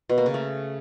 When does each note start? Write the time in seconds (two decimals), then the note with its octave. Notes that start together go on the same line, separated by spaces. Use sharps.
0.09 B2
0.18 A#3
0.26 C#3
0.34 A3